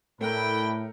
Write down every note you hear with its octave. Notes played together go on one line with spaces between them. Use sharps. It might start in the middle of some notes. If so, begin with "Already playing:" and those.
A2 A3 D4 E4 A#4 B4 G5